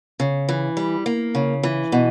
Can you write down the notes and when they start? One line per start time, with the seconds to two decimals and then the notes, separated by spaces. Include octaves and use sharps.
0.20 C#3
0.49 E3
0.77 G3
1.06 A#3
1.35 C#3
1.63 E3
1.92 B2